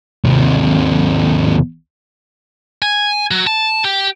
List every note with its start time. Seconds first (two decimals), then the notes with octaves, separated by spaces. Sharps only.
0.25 D#2 C3
2.82 G#5
3.31 F#3
3.47 A5
3.85 G4